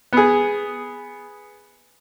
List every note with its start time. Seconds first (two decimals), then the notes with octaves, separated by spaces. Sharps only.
0.13 B3 G#4